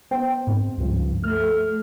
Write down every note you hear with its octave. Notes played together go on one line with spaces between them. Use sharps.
B3 C5 G5
G#2 C4
C#2 G2 F3
A3 F6